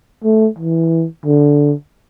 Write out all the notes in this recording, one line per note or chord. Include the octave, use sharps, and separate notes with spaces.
A3
E3
D3